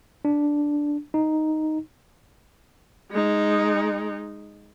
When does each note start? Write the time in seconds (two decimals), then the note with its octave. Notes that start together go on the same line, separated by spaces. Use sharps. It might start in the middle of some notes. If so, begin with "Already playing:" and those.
0.25 D4
1.14 D#4
3.11 G#3 D#4